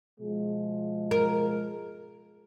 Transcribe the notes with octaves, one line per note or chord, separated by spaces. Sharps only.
B2 F3 G#3
A#4